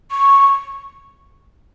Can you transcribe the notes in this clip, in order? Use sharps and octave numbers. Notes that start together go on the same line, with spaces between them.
C#6